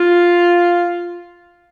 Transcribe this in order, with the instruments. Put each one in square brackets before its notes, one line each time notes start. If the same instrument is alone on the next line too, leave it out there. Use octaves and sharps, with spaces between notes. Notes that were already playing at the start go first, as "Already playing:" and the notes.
Already playing: [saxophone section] F4